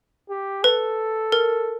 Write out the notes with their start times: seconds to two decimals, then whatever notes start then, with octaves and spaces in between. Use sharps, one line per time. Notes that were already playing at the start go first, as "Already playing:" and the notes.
0.30 G4
0.63 A4 B4
1.32 A#4